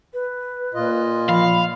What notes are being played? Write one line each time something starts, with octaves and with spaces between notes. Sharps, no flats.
B4
A#2 F4 D#5
F3 F5 B5